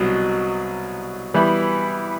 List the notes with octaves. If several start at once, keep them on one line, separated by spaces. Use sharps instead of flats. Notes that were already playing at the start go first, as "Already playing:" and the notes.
Already playing: C2 B2 F#3
E3 G3 B3 E4